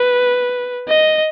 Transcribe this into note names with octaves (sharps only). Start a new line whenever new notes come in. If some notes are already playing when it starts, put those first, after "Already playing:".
Already playing: B4
D#5